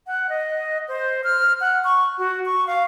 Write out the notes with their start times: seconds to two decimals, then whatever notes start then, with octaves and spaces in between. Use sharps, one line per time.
0.07 F#5
0.29 D#5
0.88 C5
1.24 F6
1.61 F#5
1.84 C#6
2.18 F#4
2.45 C#6
2.67 F5